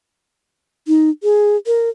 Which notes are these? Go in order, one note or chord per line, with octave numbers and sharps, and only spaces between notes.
D#4
G#4
A#4